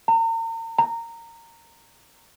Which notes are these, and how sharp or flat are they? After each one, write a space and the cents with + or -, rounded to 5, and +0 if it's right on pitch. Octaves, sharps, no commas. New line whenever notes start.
A#5 -40
A#5 -15